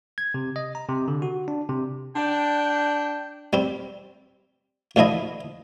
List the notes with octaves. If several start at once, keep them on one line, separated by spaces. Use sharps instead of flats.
G#6
C3
D#5
A#5
C3
D3
F#4
D4
C3
D4 G5
G3 C4
D2 D3 F3 E4 D#5